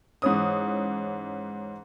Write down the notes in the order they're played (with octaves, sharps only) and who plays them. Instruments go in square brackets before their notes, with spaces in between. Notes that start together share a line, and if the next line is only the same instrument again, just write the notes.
[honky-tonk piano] G#2 E3 C#4 D#6